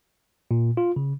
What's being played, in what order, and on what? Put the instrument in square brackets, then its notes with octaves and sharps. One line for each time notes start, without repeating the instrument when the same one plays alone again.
[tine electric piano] A#2
F4
C#3